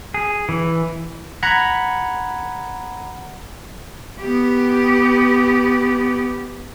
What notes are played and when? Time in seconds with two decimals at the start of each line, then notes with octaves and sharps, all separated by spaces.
0.14 G#4
0.49 E3
1.43 F#5 A#5 B5 G#6 C#7
4.19 B3 G4